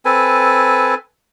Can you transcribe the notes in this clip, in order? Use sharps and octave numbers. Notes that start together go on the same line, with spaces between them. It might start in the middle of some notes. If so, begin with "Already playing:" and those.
C4 A4 B4 G#5